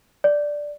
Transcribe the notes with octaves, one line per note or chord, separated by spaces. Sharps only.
D5